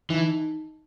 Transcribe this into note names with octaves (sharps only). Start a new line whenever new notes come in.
E3 D#4